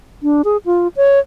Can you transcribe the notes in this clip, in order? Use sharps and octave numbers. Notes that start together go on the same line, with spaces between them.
D4
G#4
F4
C#5